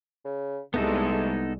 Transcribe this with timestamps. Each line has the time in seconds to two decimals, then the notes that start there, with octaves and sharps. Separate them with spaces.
0.25 C#3
0.74 C2 G#3 A3 B3 D#4 A4